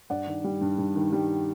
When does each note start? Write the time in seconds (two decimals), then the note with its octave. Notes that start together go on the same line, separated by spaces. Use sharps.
0.10 G2 D5 F#5
0.27 D#3
0.44 G3
0.61 G2
0.78 G2
0.95 D#3
1.12 G3